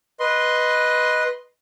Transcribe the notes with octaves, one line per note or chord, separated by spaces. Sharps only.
B4 D#5 C6